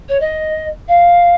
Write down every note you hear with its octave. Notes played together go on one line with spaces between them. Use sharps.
C#5
D#5
F5